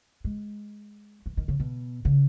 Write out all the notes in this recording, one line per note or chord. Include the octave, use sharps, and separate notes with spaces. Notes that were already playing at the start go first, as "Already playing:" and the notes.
G#3
E3
D#3
C#3
B2
C#3